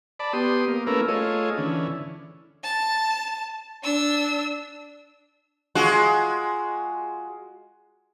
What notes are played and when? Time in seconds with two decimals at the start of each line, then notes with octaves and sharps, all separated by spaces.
0.20 D5 A5 B5
0.33 B3 G4 C6 D#6
0.68 A#3
0.87 A3 A#3 C#4 E4 A#4 B4
1.08 A3 F4 G#4 C#5 D#5
1.58 D3 E3 C#4
2.64 A5
3.84 D4 E6
5.75 G#3 F4 F#4